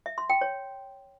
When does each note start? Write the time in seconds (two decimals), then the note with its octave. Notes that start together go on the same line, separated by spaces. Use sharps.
0.06 E5
0.18 C6
0.30 G5
0.41 C#5